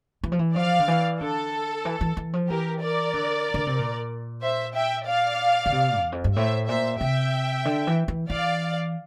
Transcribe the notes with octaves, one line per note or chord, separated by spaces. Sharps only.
E3
F3
E3
F3 D5 F5
D3
E3
D3 A4
E3
E3
E3
F3
E3 G4 A#4
A#4 D5
D3
D3
C3
A#2
C5 E5
E5 G5
D5 F5
D3
C3
E2
F2
G2
A2 C5 E5
A#2 C5 E5
C3 E5 G5
D3
E3
E3
E3 D5 F5